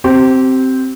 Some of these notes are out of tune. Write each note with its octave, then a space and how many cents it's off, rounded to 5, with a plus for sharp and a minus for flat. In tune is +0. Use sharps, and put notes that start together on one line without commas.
C4 +0 G4 -30